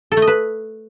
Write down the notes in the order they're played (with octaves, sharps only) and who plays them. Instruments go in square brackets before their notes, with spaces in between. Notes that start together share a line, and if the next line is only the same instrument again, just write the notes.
[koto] A4
A3
D#5
B4